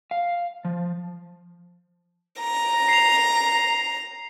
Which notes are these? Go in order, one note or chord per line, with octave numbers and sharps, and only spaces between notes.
F5
F3
A#5
C7 F7